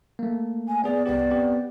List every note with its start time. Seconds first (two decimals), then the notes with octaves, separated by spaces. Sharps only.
0.19 A3 A#3
0.68 G#5
0.84 B3 G#4 D5
1.06 C2 B3 G4 D5
1.31 B3 C4 G4